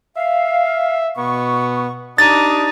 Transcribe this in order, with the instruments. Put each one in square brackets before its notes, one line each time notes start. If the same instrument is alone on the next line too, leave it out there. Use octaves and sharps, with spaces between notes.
[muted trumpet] E5 [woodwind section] F5
[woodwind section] B2 C#6 [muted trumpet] B3
[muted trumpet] D4 [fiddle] D#4 [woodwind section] G4 D6 D#6 [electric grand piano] A6